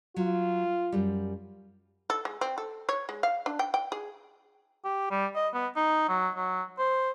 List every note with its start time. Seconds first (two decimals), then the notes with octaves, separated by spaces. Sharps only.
0.16 F#3 F4
0.92 F#2 G3
2.10 A4
2.25 G#3
2.41 C4
2.58 A4
2.89 C#5
3.09 G#3
3.23 F5
3.46 D4
3.59 G5
3.74 G5
3.92 G#4
4.84 G4
5.11 G3
5.35 D#5
5.54 B3
5.76 D#4
6.08 F#3
6.35 F#3
6.79 C5